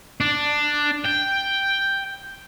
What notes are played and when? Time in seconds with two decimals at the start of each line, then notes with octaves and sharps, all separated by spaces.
0.21 D4
1.05 G5